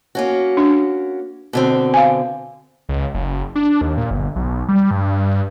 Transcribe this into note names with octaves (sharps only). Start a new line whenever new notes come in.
A#3 C#4 F#4
D4
B2 D3 C4
F5 G#5
C#2
F#1
D4
D#2
A#2
G1
B1
G3
G2